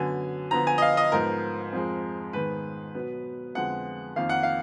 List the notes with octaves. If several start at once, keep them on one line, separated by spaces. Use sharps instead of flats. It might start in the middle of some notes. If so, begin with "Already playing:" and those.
Already playing: F#2 D3 F#3 B3 G#5
D3 F3 B3 A#5
G#5
D#5
F5
D#5
G#2 F3 B3 A#4
F2 F3 G#3
G#2 D#3 G#3 B3 B4
B2 F#3 B3
F2 D3 F3 G#3 B3 F#5
F2 D#3 A#3 F5
F#5
F5